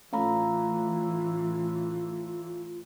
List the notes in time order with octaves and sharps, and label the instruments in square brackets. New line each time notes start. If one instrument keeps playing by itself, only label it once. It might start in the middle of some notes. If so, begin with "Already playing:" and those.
[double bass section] A2 E3 [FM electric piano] A3 C#4 [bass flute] F4 [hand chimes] F5 A#5 B5